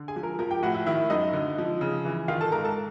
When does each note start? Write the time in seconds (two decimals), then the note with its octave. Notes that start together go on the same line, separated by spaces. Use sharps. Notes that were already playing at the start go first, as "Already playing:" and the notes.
Already playing: D3
0.08 G#4 G#5
0.16 F3
0.23 A#4 A#5
0.39 F3 A#4 A#5
0.51 G4 G5
0.63 A2 F#4 F#5
0.74 E4 E5
0.86 D#3 E4 E5
1.10 F#2 D#4 D#5
1.33 D3
1.58 F3
1.81 C#3
2.05 E3
2.28 D#3 F4 F5
2.41 A4 A5
2.52 G#2 A#4 A#5
2.64 A4 A5